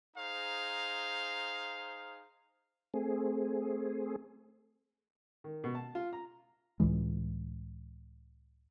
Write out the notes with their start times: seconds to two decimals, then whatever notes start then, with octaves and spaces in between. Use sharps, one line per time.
0.16 D#4 G#4 C5 F5 A#5
2.94 A3 C4 G#4
5.44 D#3
5.64 B2
5.75 A5
5.95 F4
6.13 A#5
6.80 C#2 A2 E3 G#3